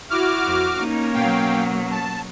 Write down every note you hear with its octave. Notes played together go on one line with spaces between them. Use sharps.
E4 F#4 D6 F6
F2
A#3 C#4 D#4
B2 F#3 F5 G5
A5